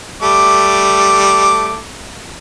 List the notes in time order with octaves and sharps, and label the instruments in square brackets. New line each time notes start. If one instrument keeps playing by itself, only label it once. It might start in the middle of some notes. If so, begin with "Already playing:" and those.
[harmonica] G3 A3 D6